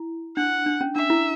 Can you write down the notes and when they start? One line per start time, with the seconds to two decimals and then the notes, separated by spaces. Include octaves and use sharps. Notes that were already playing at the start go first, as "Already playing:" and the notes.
Already playing: E4
0.37 D4 F#5
0.66 D4
0.81 C#4
0.95 D4 E5
1.10 E4